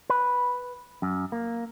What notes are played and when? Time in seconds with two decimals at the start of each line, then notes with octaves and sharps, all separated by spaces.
0.10 B4
1.02 F#2
1.32 A#3